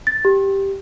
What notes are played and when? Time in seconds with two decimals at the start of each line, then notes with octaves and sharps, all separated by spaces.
0.07 A6
0.25 G4